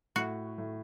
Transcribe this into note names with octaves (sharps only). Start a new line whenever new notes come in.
A2 F#4
A2